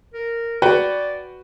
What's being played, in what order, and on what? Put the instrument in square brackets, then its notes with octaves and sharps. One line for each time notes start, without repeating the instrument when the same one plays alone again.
[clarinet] A#4
[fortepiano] F#4 B4 G5 [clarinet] D5